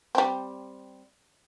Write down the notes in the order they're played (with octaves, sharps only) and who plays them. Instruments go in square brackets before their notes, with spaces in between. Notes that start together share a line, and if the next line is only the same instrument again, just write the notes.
[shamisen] G3 C4